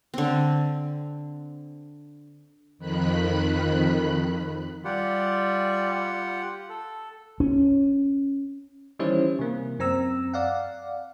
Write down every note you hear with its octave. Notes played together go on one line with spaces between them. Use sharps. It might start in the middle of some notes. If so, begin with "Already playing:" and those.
D3 C4
F2 D#3 B5 F#6
G3 F4 G4 F#5
A4
C#4
D#3 E3 G3 C#4 E4 C5
C3 A#3
F#2 C4 A#5 E6
D5 F5 F#5